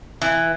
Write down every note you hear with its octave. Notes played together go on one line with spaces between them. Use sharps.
E3